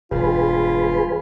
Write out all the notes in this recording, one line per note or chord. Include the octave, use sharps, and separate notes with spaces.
E1 G2 F4 G#4 B4